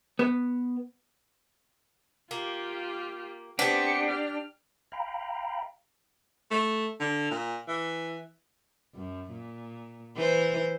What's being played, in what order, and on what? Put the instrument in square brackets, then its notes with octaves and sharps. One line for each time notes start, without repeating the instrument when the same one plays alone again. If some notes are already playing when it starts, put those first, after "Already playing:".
[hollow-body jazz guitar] B3
[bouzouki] A#3 [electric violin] F4 G4
[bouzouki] B3 C4 [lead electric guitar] D4 [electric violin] G4 C#7
[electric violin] G4 F6
[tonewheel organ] F5 G5 A#5 B5
[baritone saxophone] A3
D3
A#2
E3
[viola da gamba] F#2
A#2
E3 C5